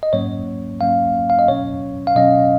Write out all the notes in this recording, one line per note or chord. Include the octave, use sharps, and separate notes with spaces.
D#5
G#2 F#3 A#3 C#4 C#5
G#2 F#3 A#3 C#4 F5
F5
D#5
B2 F#3 C#4 C#5
F5
B2 F#3 C#4 D#5